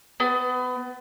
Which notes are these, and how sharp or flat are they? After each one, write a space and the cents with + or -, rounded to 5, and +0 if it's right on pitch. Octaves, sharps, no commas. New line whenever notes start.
B3 +25